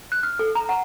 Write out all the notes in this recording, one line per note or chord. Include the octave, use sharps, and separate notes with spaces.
F#6
F6
A4
A#5
F#5